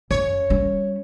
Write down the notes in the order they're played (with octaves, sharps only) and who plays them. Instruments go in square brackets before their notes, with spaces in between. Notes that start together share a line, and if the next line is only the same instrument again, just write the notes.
[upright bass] F#2 [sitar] C#5
[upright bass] G3 C#4